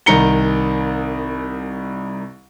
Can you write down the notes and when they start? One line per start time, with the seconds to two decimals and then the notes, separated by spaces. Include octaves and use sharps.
0.06 C2 D#3 A#5 C#7 G7